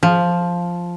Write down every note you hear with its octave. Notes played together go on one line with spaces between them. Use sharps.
F3